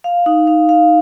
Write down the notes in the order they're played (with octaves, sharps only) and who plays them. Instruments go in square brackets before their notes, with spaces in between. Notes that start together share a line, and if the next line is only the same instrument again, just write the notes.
[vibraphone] F5
D#4
F5
F5